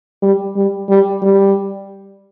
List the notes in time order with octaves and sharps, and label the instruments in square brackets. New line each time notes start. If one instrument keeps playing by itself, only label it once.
[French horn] G3
G3
G3
G3